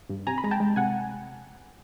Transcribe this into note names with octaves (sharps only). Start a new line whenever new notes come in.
G2
C3 G#5 A#5
B5
G#3 A#5
G5 A5
G#3
C3 F#5 G#5